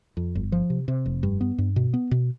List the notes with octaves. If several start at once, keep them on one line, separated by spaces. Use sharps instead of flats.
F2
G1
F3
C3
C3
F1
G2
B3
G2
B2
B3
B2